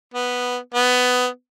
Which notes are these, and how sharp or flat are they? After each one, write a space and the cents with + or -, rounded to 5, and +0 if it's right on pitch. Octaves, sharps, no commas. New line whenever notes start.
B3 +0
B3 +15